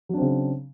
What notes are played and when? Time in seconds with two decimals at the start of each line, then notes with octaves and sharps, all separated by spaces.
0.09 F#3
0.13 D4
0.18 C4
0.22 C#3